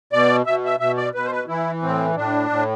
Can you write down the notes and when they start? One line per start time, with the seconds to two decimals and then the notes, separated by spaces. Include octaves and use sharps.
0.13 B2 D5
0.46 B2 E5
0.65 E5
0.80 B2 E5
0.97 D5
1.15 B2 B4
1.25 C5
1.32 B4
1.48 E3 E4
1.82 A2 C4
2.16 A2 D4
2.50 A2